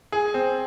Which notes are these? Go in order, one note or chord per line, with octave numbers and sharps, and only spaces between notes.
G#4
C4